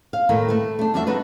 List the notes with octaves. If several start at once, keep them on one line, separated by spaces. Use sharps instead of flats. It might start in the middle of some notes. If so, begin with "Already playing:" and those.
F5
A2 D#3 A3 A#3
A3 B4
A3 D4
F2 G3 D4 F#4 E5
D4 D#4 F#4 B4